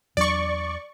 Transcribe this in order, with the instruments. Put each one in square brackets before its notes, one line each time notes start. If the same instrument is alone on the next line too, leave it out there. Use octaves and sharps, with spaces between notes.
[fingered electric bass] E2 F#3 D4 [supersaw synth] D5 C#6